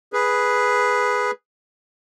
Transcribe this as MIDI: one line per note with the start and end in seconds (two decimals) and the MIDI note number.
0.13 1.31 68
0.13 1.31 71